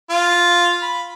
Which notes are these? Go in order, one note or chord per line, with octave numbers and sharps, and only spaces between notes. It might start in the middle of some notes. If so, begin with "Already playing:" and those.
F4
B5